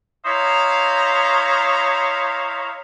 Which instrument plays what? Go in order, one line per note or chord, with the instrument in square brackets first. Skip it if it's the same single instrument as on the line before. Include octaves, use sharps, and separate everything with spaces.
[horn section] E4 C5 C#5 D#5 F5 A#5